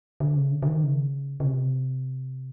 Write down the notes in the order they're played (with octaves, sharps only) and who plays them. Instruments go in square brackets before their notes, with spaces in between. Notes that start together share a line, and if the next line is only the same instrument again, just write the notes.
[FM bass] D3
C#3
D3
D3
D#3
C#3
C#3
C3